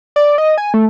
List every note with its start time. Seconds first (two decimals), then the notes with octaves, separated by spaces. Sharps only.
0.16 D5
0.38 D#5
0.58 G#5
0.74 A3